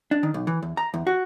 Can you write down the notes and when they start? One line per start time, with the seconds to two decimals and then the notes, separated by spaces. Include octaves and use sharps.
0.11 D4
0.23 D#3
0.34 B1
0.47 E3
0.62 E2
0.77 A#5
0.94 E2
1.07 F#4